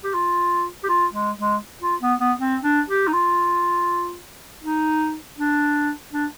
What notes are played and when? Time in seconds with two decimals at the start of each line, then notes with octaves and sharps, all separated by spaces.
0.04 G4
0.14 F4
0.83 G4
0.89 F4
1.13 G#3
1.38 G#3
1.82 F4
2.01 B3
2.19 B3
2.39 C4
2.63 D4
2.88 G4
3.07 D#4
3.13 F4
4.63 D#4
5.38 D4
6.13 D4